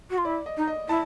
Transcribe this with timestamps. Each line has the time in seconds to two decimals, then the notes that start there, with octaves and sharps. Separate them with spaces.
0.10 F#4
0.18 F4
0.25 E4 D5
0.46 D#5
0.57 D#4
0.67 D#5
0.89 E4 A5